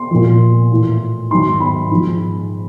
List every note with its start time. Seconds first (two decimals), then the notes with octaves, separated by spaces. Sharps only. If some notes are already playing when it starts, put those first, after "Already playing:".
Already playing: C6
0.11 A#2 F3
0.71 A2 E3
1.31 G#2 D#3 F#3 C6
1.60 B5
1.91 G#2 F3